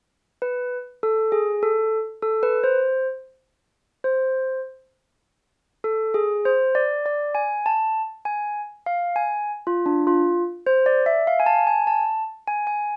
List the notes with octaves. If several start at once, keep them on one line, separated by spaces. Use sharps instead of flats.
B4
A4
G#4
A4
A4
B4
C5
C5
A4
G#4
C5
D5
D5
G#5
A5
G#5
F5
G#5
F4
D4
F4
C5
D5
E5
F5
G#5
A5
G#5
A5
G#5
G#5